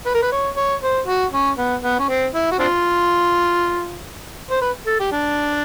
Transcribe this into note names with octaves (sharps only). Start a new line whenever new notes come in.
B4
A#4
B4
C#5
C#5
C5
F#4
C#4
B3
B3
C#4
C4
E4
F#4
C4 D4 F4
C5
B4
A4
G4
D4